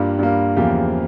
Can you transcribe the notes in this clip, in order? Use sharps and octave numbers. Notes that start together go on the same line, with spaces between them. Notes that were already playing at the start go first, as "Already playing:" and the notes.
Already playing: G2 G3 A#3 F4
G2 G3 A#3
E2 C#3 F3 A#3 G4